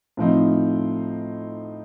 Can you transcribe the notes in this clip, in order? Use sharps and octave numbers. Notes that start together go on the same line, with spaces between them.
A2 F3 C4 D#4